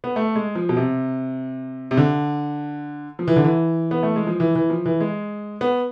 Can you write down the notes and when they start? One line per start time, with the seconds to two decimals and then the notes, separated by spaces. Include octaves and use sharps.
0.04 B3
0.16 A3
0.36 G#3
0.55 F3
0.69 B2
0.77 C3
1.91 C3
1.97 D3
3.19 F3
3.28 E3
3.36 D3
3.44 E3
3.91 B3
4.03 A3
4.16 G#3
4.27 F3
4.40 E3
4.55 E3
4.70 F3
4.86 E3
5.00 G#3
5.61 B3